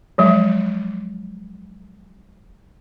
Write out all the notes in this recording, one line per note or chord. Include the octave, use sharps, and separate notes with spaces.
F3 F#3 G#3